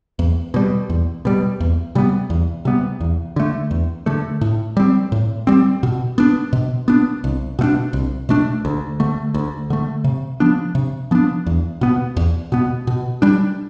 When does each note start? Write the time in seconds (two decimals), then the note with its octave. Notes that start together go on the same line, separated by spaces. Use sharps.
0.19 E2
0.54 B2 G3
0.90 E2
1.25 B2 G3
1.60 E2
1.95 C3 G3 B3
2.30 E2
2.65 C3 G3 B3
3.01 E2
3.36 D3 A3
3.71 E2
4.06 D3 A3
4.41 A2
4.77 G3 C4
5.12 A2
5.47 G3 C4
5.83 B2
6.18 B3 D4
6.53 B2
6.88 B3 D4
7.24 C2
7.59 B2 A3 D4
7.93 C2
8.29 B2 A3 D4
8.65 D2
9.00 D3 A3
9.34 D2
9.70 D3 A3
10.04 C3
10.40 F3 B3 D4
10.75 C3
11.11 F3 B3 D4
11.46 E2
11.81 B2 B3
12.17 E2
12.52 B2 B3
12.87 B2
13.22 G3 D4